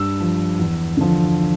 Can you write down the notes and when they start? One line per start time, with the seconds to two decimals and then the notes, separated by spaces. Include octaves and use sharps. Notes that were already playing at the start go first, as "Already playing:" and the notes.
Already playing: G2 E6
0.20 F3
0.59 E2
0.97 D3 F3